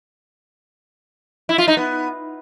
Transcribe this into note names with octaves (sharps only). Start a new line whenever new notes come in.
E4
F4
D#4
B3